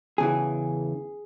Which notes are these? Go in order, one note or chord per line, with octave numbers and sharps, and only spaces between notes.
E2 C#3 E3 G#4